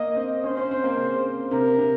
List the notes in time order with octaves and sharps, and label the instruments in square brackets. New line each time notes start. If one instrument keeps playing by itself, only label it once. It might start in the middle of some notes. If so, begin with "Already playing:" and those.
Already playing: [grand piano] A#3 [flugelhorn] D#5
[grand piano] C4
[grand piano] C#4 [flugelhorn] C5
[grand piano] C#4
C4
A#3
C#3
[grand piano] C3 [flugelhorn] A#4
[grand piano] C3